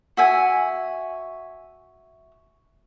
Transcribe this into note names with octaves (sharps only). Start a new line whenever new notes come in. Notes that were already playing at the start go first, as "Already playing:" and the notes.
F#4 E5 G#5